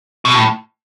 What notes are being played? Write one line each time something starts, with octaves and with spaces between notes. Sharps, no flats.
B2
A2